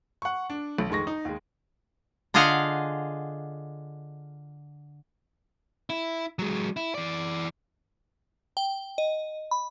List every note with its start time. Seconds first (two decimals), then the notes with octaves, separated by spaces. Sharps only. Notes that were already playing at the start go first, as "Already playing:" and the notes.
0.22 F#5 C#6
0.50 D4
0.78 B1
0.90 F1 D#3 G#3 C#6 A#6
1.07 D#4
1.25 D#2 G#3
2.34 D3 F4 G#4 D#5 F5 F#5
5.90 E4
6.39 F#3 G#3
6.77 E4
6.95 E3 D5
8.57 G5
8.98 D#5
9.51 B5